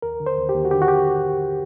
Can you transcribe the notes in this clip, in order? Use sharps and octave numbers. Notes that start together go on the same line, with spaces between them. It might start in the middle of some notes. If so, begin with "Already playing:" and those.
D#2 A#4
D3
C5
D#2
G4
D#2
F#4
D3 G4
F#4
G4